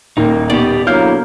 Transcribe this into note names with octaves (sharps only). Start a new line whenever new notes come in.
D#1 D#3 A#3 D#4
B2 G4 D5
D3 F#3 A#3 E4 F5 F6 G6